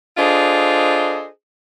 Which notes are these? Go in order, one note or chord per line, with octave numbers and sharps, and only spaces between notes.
D4 F4 G#4 A4 C5 D#5